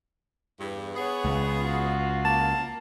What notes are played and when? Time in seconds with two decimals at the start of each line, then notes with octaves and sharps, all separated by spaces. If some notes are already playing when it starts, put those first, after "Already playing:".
0.59 E2 G2
0.95 B3 G#4 C#5 F#5
1.25 C#2
1.61 F4 F#4
2.25 A#3 A5